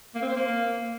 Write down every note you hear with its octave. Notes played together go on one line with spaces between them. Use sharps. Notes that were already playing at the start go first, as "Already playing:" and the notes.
A#3
C4
C5
A#3